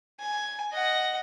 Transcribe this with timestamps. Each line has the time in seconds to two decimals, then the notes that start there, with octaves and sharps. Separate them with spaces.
0.20 G#5
0.73 D#5 F#5